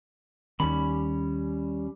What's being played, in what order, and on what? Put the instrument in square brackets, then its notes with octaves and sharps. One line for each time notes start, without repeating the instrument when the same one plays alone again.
[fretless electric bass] D#2 D#3 [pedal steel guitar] G3 C#4 B5